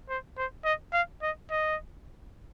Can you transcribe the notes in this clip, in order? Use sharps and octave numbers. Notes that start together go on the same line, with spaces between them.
C5
C5
D#5
F5
D#5
D#5